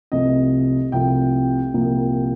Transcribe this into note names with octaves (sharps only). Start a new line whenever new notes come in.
C2 C3 F3 A3 D#5
C2 C3 F3 A3 G5
C2 A#2 F3 A#3